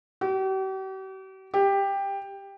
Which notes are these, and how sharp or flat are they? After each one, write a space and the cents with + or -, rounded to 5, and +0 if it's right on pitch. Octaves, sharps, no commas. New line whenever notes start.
G4 -45
G4 +10